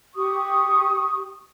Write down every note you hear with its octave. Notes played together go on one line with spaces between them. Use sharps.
G4 C#6 D#6